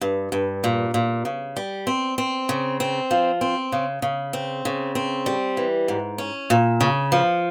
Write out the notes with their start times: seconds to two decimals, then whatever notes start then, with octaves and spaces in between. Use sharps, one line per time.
0.01 G2
0.32 G2
0.64 A#2
0.94 A#2
1.25 C#3
1.56 G3
1.87 C4
2.18 C4
2.49 C#3
2.80 C4
3.11 F3
3.41 C4
3.72 C#3
4.02 C#3
4.33 C4
4.65 C#3
4.95 C4
5.26 G3
5.57 E3
5.88 G#2
6.18 C#4
6.50 A#2
6.81 C#3
7.12 F3